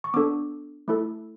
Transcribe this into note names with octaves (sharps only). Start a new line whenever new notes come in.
C#6
B3 D4 A4 D6
A3 E4 A4